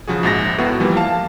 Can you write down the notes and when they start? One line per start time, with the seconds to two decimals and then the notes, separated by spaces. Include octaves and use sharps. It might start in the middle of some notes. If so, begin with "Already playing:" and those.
0.08 C#3 F3 F#4 G#4
0.23 A#1 G#2 A6 A#6
0.58 A2 B3 F#4
0.80 E3 F3 G3 A#3
0.97 F5 A5